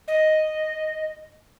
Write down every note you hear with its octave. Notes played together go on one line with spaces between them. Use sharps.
D#5